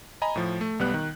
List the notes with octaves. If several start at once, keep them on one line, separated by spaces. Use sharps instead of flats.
D#5 G#5 A#5 B5
A2 F3
A3
B1 G3 B3 F#6
D#3